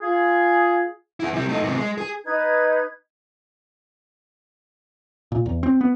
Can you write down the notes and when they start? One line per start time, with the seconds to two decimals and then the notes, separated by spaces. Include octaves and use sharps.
0.01 F4 G#4
1.20 E4 G#4
1.33 C3 G3
1.49 A3 D#4
1.63 G#2 C3
1.77 G#3
1.98 G#4
2.24 D#4 B4 G#6
5.32 A#2
5.46 E2
5.63 C4
5.81 B3